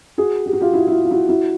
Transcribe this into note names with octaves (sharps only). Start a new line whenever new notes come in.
F#4 G#4
G4
F#4
F4 G4
E4 F#4
E4
F4
F4
E4 F#4
E4 F#4